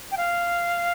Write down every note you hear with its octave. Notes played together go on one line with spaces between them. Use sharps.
G5
F5